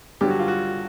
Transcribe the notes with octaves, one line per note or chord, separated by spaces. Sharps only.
G2 D3 F#3 G4
F#4
F4
F#4